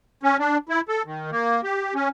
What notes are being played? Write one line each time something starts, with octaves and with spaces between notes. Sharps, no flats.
C#4
D4
E4
A4
D#3
A#3
G4
C#4